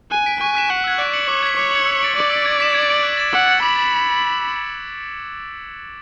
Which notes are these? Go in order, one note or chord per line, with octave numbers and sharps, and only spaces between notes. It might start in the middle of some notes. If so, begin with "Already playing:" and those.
G#5 F#6
B6 D7
G#5 C#6
F#6 B6 E7
F#5 C#6
E6 G#6
D5 F#6
C#7 F#7
C#5 D6
G#6 B6
C#5 D6
G#6 C#7 F#7
E6
A6 D7 F#7
D5 C#6
E6 B6 D7
G#6
B6 E7
G#6
D7 F#7
F#6
A6 E7
F#5 E6
G#6 C#7 F#7
B5 D6
A6 E7